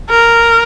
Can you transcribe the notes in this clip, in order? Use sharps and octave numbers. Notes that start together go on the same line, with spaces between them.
A#4